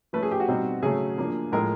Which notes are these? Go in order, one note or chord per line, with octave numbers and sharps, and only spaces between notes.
F3 A3 C#4 B4
G#4
G4
F#4
B2 G3 C4 D#4
C#3 F#3 A3 G#4
F3 A#3 D4
A2 F3 G#3 A#4